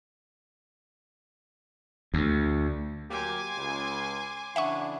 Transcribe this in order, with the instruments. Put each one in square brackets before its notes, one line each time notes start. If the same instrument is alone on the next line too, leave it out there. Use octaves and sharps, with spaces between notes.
[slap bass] D2
[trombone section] F#3 A#3 G4 [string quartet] G#5 C6 D6
[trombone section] C#2
[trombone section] C#3 E3 D4 [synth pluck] E5 F#5 C#6